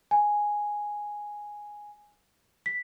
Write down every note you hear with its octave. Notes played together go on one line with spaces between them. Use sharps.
G#5
B6